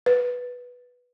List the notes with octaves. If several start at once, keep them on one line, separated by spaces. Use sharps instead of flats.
B4